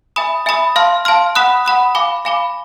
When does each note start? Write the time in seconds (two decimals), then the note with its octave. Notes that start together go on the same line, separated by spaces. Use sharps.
0.16 E5 G#5 B5 D#6
0.46 E5 G#5 B5 D#6
0.76 F5 A5 C6 F6
1.05 F5 A5 C6 F6
1.35 F#5 B5 D#6 F#6
1.65 F#5 B5 D#6 F#6
1.95 F5 G#5 B5 D6
2.25 F5 G#5 B5 D6